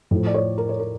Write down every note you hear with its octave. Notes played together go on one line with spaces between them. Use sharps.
A2 F3
D5
C#5
A#4
C#5
A#4